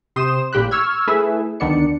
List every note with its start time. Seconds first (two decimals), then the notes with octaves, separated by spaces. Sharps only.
0.16 C3 C5 C6 D#6 E7
0.53 A1 A#2 G4 B5 F#6
0.71 C#6 E6 F6 G#6
1.07 A3 E4 G#4 A4 B4 E5
1.60 D2 D#3 B3 D4 D5 C#7